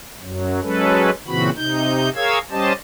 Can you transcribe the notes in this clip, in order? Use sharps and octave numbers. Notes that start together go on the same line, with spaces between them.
F#2 F#3
F#3 G#3 C#4 A4 B4
A#2 C#3 E3 C4 F#4 B5
C3 D#4 G6
G#4 A#4 C#5 F5 E6 G#6
G3 C#4 G4 C5 D#5 A5